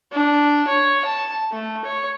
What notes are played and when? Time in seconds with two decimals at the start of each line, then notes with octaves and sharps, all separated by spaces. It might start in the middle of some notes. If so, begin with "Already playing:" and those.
0.12 D4
0.68 C#5
1.05 A5
1.52 A3
1.85 C#5